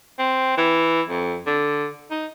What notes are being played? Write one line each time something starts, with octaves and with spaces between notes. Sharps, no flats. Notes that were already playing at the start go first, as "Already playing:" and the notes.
C4
E3
F2
D3
D#4